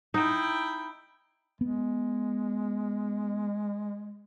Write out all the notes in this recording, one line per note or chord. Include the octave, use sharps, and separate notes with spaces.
D#4 E4 G5
G#3 B3